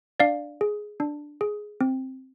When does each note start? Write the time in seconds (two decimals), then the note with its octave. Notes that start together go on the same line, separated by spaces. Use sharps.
0.20 D4 D5 F5
0.61 G#4
1.00 D4
1.41 G#4
1.81 C4